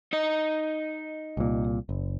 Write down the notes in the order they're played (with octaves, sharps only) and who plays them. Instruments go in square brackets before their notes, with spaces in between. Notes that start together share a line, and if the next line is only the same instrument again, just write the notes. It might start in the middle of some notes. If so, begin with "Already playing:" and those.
[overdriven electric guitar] D#4 D#5
[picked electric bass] C2 A#2
F#1